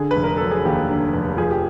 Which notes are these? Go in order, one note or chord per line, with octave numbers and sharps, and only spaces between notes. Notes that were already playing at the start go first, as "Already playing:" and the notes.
Already playing: D3 G#4
F1 B4
A#4
F#3 A4
G#4
D#2 G4
D3
F1
F3 G#4
G4